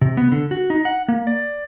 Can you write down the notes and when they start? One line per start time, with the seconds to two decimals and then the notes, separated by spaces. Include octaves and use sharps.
0.01 C3
0.17 B3
0.32 D3
0.51 F#4
0.70 D#4
0.85 F#5
1.08 A#3
1.27 D5